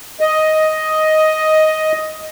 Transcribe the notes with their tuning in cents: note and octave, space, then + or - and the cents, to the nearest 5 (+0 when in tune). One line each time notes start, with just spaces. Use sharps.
D#5 +5